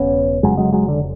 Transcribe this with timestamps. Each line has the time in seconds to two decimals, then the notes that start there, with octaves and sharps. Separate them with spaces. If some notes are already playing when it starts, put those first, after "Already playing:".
Already playing: E1 C#3 B3 C#4
0.43 F1 F2 C#3 F#3 G#3
0.57 F#3 G#3
0.72 F#3 G#3
0.88 D3